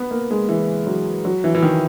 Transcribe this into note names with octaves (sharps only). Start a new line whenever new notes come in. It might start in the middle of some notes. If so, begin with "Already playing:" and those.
Already playing: B3
A#3
G#3
E3
F#3
F#3
E3
E3
D#3